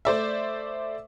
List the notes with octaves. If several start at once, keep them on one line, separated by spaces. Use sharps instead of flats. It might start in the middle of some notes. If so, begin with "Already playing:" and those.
A3 C5 D5 E5